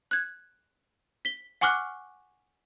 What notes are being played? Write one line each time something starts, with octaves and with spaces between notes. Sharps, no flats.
F#6 G#6
B6 G7
F#5 G#5 C#6 D6 F6 F#6